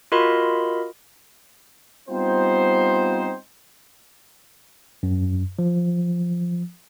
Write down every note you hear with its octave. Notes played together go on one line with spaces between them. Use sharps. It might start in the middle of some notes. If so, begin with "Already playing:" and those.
F4 F#4 A#4 D#5 B5 C6
G3 B3 C4 D#4 F4 C5
F#2
F3